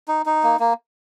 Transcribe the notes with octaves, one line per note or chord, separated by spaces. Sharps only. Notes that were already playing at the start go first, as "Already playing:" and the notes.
D#4
D#4
A#3
A#3